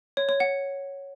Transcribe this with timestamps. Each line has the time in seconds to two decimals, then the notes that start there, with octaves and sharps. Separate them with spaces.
0.17 C#5
0.29 C#5
0.40 F#5